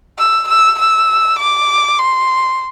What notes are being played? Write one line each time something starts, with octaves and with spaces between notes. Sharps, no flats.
E6
E6
E6
D6
C6